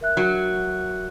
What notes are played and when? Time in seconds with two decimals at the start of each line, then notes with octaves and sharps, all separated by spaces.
0.01 A#4 E5 F#6
0.17 F#3